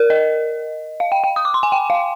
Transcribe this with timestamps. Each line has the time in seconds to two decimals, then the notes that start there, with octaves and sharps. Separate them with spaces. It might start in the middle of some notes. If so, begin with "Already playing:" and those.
Already playing: A#4
0.10 D#5
1.00 F5
1.12 G5
1.24 G5
1.36 D#6
1.45 D6
1.54 C6
1.63 G#5
1.72 G5
1.90 F5